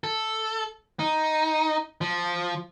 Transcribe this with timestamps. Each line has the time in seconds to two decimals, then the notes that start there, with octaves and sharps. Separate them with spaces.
0.04 A4
0.99 D#4
2.01 F3